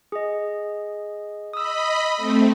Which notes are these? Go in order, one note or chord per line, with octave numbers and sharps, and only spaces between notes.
G#4 D#5
D#5 B5 D#6 E6
A3 C4